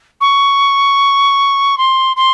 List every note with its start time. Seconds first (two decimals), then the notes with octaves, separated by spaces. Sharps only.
0.20 C#6
1.77 C6
2.16 C6